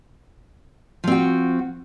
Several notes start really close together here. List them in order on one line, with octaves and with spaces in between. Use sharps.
F3 C4 F#4